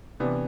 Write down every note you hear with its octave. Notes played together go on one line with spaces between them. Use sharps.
C3 E3 B3 D4